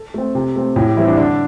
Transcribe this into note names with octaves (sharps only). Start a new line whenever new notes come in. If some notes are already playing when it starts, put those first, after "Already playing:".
Already playing: A4
A3 C4
C3
A3 C4
A2
G4
E3 G3 C4 E4
D4
D3 D4